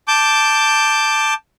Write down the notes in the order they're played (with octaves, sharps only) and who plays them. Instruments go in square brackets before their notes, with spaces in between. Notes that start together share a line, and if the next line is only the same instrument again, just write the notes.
[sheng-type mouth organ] A5 D6 G6